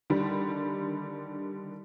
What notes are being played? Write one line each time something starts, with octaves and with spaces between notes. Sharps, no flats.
D3 D#3 G3